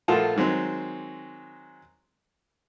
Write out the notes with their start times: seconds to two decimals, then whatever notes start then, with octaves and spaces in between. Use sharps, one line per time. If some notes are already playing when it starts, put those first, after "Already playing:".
0.08 A#1 A3 F4 A#4 F#5 A5
0.36 D#3 F#3 G#3 C4